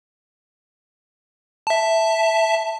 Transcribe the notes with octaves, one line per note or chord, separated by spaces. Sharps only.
E5 A5